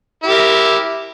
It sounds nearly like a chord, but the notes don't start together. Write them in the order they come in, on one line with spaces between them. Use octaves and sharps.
E4 G4 A#4